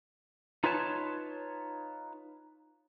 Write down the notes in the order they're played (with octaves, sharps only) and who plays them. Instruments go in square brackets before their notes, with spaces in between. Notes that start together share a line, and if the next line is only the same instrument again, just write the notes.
[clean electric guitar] D#4 F4 B4 C#5 G#5 A5